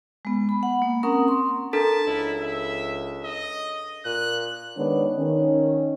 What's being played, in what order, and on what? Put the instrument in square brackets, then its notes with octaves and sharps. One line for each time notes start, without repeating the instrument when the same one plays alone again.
[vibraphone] G#3 B3
B5
F#5
A#3
C4 C#4 A#4 F#5 A#5 D#6
C6
[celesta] D4 A4 B6 [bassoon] A#4 [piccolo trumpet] A5
[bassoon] C#2 [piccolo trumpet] E4
[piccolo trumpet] E5
D#5
[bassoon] A#2 [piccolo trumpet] F#6
[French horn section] D#3 G#3 B3 D4 C#5 D5
D#3 C#4